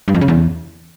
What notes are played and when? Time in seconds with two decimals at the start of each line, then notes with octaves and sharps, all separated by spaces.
0.08 G2
0.15 F2
0.21 C#3
0.28 E2